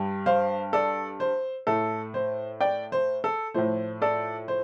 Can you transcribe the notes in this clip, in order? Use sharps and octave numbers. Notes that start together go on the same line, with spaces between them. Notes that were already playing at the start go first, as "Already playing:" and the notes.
Already playing: G2 G3
C5 F5
A4 D5
C5
A2 A3 A4
C5
D5 G5
C5
A4
A2 F3 A3 C5
A4 D5
C5